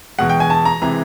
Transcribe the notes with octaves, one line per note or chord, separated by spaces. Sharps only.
E2 B2 G#3 F#5
G5
G#5
A5
A#5
C3 E3 G#3 A#5